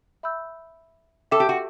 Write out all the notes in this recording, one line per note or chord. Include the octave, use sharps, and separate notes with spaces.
E5 B5 E6 G6
A4 E5 G5 D6
G4
F#4